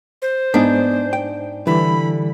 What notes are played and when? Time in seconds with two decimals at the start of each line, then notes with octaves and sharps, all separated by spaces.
0.22 C5
0.54 G#2 B3 D4 D#4 G#5
1.13 G5
1.67 D3 E3 G3 B5